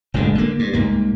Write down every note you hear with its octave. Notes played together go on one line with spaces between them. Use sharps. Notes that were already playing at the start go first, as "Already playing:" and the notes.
F#1 A2 D3 G#3
D3 A#3
G2
C2 G#2 A#3